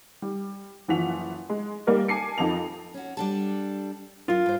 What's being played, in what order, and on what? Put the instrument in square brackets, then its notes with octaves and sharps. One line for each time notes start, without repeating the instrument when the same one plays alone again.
[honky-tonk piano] G3
F#1 E3 F3 F#5 B6 F7
G#3
G3 A#3 A#4 D5 D#5
G#5 A5 D6 C7 C#7
F2 F3 D#4 A5 F7
[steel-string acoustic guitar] C#4 F#4
G3 D4 A4
[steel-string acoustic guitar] F#2 A#4 [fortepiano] F4
[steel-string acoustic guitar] G2 C5